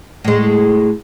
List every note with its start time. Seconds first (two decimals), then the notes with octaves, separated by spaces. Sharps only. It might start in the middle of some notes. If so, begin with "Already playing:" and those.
0.24 A2 G#3